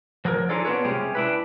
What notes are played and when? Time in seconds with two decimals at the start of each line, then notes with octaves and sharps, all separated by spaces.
0.25 F3 F#3 G#4 A#4
0.49 D4 D#4 F4 G#4 A4 D5
0.65 B3 C4 D4 F4 B4 C#5
0.85 C3 G3 G#3 C#4 G4 G#4
1.15 D4 E4 B4